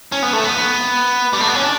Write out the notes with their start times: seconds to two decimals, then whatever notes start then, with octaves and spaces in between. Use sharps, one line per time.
0.12 C#4
0.23 B3
0.33 A3
0.44 B3
1.33 G3
1.40 A3
1.47 B3
1.55 C#4
1.62 D4